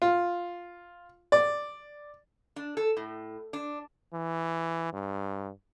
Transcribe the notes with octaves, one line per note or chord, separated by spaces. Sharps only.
F4
D5
D4
A4
A2
D4
E3
G2